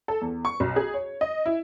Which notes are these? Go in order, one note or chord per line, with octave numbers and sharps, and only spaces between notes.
A4
E2
C#6
B1
G#4
C#5
D#5
E4